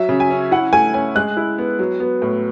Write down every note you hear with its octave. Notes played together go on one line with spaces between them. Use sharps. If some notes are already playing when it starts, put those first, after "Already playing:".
Already playing: F#3 E5
C#3
G#5
C#4
E4 F#5
A3 G#5
C#4 G#5
G#3 F#6
E4
B3
F#3
B3
A2